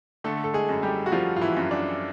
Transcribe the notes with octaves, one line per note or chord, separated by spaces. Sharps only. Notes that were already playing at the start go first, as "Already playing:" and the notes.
D3 A3 A4
A4
G#3 G#4
F#2
G3 G4
F#4
F3 G3 F4
F4
E3 E4
F#2
D4